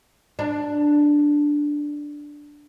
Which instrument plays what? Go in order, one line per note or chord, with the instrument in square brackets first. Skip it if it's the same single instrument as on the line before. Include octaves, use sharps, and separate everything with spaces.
[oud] D4